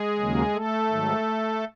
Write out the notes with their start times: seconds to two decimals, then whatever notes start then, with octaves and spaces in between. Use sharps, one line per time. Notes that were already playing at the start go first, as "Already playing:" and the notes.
Already playing: G#3 G#4
0.19 D#2 C#3 F#3 A#3
0.54 A3 A4
0.89 G#2 D#3 F#3